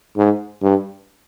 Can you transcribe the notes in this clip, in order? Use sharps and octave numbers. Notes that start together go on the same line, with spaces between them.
G#2
G2